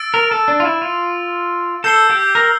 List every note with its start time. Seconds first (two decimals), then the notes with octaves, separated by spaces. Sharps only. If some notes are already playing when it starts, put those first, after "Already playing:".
Already playing: E6 A6 D7
0.14 A#4
0.31 A4
0.48 D4
0.60 F4
0.65 E4
0.82 F4
1.84 A4 E6 G6 C7 G7
2.10 G4
2.35 A#4